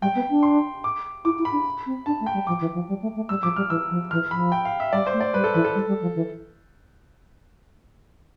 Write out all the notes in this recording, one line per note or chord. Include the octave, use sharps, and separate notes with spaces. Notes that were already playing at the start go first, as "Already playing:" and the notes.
G3 G5
B3
D4
C6
D6
E4 D6
E4
B5
D4
C4
D4 A5
A3
G5
G3
F3 D6
E3
F3
G3
A3
A3
G3 E6
F3 D6
G3 F6
E3 E6
F3
E3 F6
F3 B5
G5
F5
E5
G3 D5
C5
A3
D5
G3 B4
A4
E3 B4
A4
G3
G3
F3
E3